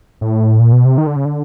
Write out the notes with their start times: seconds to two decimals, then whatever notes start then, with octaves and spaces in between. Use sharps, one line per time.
0.21 A2
0.60 A#2
0.72 B2
0.85 C3
0.98 D#3
1.07 D3
1.16 C#3
1.25 D3